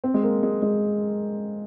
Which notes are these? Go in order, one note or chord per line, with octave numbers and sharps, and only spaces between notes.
C4
G#3
A#3
G#3
G#3